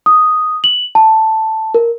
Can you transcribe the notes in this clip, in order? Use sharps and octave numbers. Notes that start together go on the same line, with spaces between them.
D#6
F#7
A5
A#4